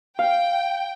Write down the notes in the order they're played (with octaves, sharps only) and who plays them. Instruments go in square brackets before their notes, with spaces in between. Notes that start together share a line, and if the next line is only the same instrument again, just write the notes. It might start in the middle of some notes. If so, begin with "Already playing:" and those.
[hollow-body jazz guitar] F5 [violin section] G5